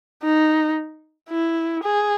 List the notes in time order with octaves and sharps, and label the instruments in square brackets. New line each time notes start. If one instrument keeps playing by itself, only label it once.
[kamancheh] D#4
E4
G#4